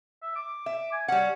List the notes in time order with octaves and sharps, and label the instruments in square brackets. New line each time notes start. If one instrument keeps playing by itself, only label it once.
[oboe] E5
D6
[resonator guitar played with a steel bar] E5
[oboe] G#5
[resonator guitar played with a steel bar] G3 F#5 [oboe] C#4